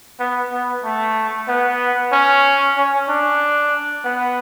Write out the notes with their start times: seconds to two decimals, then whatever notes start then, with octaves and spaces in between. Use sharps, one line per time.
0.20 B3
0.52 B3
0.84 A3
1.48 B3
2.12 C#4
2.77 C#4
3.09 D4
4.05 B3